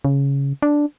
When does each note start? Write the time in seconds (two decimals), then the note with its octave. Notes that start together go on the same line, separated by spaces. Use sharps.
0.05 C#3
0.62 D4